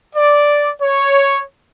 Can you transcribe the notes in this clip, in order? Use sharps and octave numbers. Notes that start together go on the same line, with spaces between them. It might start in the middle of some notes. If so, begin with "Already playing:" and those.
D5
C#5